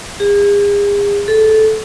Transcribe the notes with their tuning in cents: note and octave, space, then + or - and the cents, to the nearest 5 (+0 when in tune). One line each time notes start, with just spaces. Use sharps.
G#4 -40
A4 -15